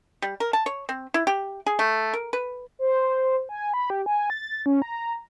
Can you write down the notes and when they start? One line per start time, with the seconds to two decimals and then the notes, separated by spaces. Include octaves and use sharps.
0.22 G3
0.40 A#4
0.53 A5
0.66 C#5
0.89 C4
1.14 E4
1.27 G4
1.66 G#4
1.79 A3
2.13 A#4
2.33 B4
2.79 C5
3.49 G#5
3.74 B5
3.90 G4
4.06 G#5
4.30 A6
4.66 C#4
4.82 A#5